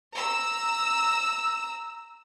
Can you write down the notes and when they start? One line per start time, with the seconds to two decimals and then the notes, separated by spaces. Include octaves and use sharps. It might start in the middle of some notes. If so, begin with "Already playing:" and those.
0.14 A#5 E6